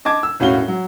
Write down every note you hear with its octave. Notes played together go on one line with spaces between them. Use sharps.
D#5 A5 D6 G#6
E6
E1 A2 C#4 F#4 F5 G7
F#3